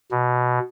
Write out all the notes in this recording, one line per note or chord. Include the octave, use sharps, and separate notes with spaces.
B2